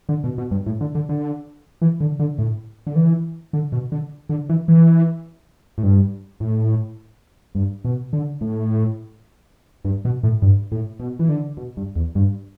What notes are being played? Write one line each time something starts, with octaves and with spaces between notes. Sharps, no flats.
D3
B2
B2
G2
A2
D3
D3
D3
E3
D3
D3
A2
D3
E3
D3
B2
D3
D3
E3
E3
A2
G2
A2
G2
B2
D3
A2
G2
B2
A2
G2
A2
B2
E3
D3
B2
G2
E2
G2